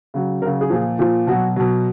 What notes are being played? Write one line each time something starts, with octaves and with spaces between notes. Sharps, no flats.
C#3 F#3
C#3 F#3 A#4
G#4
A#2 F3
A#2 F3
B2 F#3 F#4
B2 F#3